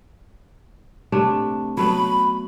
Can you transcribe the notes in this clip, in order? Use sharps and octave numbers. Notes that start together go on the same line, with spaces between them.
C3 A3 D4
F#3 A3 B3 B5